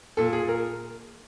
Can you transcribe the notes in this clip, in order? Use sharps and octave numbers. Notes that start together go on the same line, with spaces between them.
A#2 A4
G#4
A#4